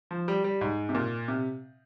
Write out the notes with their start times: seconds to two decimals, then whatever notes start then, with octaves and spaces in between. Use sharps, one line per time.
0.11 F3
0.28 G3
0.44 G3
0.61 G#2
0.89 C3
0.95 A#2
1.28 C3